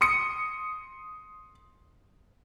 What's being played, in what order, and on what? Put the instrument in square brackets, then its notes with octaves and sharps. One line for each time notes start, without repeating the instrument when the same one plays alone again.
[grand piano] C6 D#6 C#7